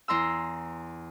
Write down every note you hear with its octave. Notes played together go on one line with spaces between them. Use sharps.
E2 A#5 C6 E6